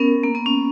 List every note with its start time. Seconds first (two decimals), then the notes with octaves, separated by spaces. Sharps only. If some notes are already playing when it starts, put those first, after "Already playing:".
Already playing: B3 C#4 A#4
0.23 A#3
0.35 B3
0.46 C#4